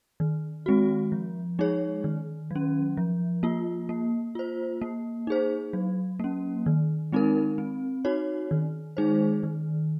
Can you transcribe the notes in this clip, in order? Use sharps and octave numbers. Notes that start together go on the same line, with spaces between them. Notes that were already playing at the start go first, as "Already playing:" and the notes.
D#3
G#3 C4 F#4
F3
G#3 D#4 G#4 C#5
D#3
F#3 C#4
F3
A#3 F4
A#3
F4 C5
A#3
D#4 G#4 C5
F#3
A#3 C#4
D#3
G#3 C4 D#4 A#4
C4
D#4 F#4 C#5
D#3
G#3 D#4 G#4 C5
D#3